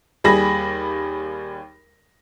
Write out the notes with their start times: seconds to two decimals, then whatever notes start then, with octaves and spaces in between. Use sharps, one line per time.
0.24 D#2 G3 G#4 B5 A#6